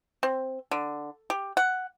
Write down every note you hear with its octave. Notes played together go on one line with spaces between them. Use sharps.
C4
D3
G4
F#5